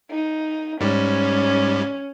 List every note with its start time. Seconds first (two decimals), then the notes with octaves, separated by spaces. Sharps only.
0.10 D#4
0.81 G#2 G3 C#4